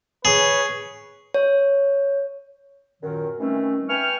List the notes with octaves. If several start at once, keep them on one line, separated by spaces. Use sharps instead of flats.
G#4 B4 C#5
C#5
F#2 A#2 D#3
D#3 E3 G3 A3 C4 C#4
B4 E5 G5 G#5 C#6 F6